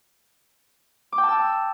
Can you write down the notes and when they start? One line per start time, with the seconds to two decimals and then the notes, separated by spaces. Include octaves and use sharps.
1.12 D6
1.18 G5
1.23 A5
1.29 E6